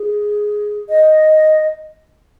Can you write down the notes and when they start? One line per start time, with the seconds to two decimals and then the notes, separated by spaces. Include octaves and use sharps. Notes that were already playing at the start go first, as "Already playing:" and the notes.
Already playing: G#4
0.89 D#5